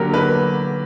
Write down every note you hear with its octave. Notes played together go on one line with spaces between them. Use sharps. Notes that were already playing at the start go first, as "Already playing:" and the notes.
Already playing: D3 F#3 A#3 G4 A#4
B4